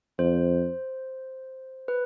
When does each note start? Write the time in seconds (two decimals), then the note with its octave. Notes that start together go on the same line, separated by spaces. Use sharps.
0.19 F2 C5
1.88 B4